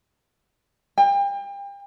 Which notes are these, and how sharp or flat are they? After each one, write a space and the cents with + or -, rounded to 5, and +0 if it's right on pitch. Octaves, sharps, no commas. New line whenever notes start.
G5 +35